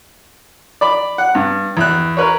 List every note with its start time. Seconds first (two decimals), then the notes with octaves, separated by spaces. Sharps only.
0.81 D5 B5
1.18 F#5
1.35 G2
1.77 E2 F#6
2.17 A#4 B4 C#5